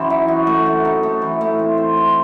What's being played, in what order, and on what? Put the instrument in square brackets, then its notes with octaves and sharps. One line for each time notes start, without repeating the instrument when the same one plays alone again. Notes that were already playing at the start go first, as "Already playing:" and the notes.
Already playing: [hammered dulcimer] F#2 E3 C4
D#4
F#4
A3
F#4
D#4
A3
E3
A3
C4
C5
C5